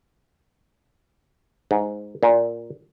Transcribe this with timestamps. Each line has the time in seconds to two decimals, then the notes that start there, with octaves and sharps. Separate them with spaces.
1.71 G#2
2.23 A#2